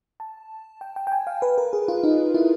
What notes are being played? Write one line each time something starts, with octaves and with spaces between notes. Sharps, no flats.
A5
G5
G5
G5
G#5
F5
B4
A#4
G#4
F4
D#4
E4